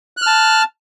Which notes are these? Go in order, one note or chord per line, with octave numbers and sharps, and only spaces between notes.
A5 F6 F#6